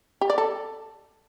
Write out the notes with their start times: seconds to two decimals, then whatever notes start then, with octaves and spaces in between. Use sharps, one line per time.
0.21 G4
0.30 D5
0.38 A4